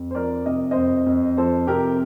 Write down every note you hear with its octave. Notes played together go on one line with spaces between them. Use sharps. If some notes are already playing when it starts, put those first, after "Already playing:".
Already playing: F2
C5
F3 A#4 D5
C3 D#5
F2 C5 D#5
F2
F3 A4 C5
C3 G4 A#4